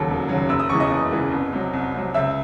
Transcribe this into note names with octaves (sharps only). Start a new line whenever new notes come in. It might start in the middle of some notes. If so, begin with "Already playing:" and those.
Already playing: D#2 C#3 F#3 A4 A5
E1
D#2 C#3 F#3
F#1 E6
D#6
E2 C#3 E3 C#6
D#5 D#6
F#1
E2 C#3 E3
C2
C3 F#3
C2
C3 F#3
C#2 E5 E6